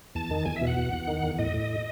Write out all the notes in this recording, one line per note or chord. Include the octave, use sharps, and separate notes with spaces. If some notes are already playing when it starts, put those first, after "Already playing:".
E2 A5
D#3
E2 G#5
E5
B2
F#5
E2
E2
D#3
E2
A2 D#5
A2